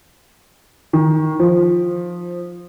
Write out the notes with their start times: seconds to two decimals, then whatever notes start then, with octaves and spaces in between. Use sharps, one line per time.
0.93 D#3
1.39 F3